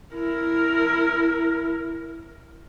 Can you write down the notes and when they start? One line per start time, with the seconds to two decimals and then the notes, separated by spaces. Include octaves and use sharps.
0.15 E4 A#4